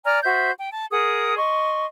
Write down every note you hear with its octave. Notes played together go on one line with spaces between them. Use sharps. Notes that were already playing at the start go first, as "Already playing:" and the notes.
D5 G#5 A#5 F6
F#4 C5 E5 G6
G5
A5
G#4 A#4 F#5 D#6
D#5 C6 C#6